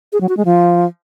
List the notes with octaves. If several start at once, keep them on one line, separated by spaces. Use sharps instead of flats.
G#4
F#3
F#4
G#3
F3